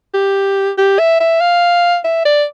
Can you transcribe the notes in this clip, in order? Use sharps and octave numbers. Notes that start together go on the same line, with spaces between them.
G4
G4
E5
E5
F5
E5
D5